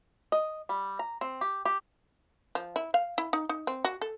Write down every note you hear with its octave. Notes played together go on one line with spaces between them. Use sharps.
D#5
G3
A#5
C4
G4
G4
F3
E4
F5
E4
D#4
D#4
C4
F#4
A4